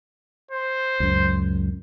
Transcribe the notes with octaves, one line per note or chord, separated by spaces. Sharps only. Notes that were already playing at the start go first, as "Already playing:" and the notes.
C5
C#2 F#2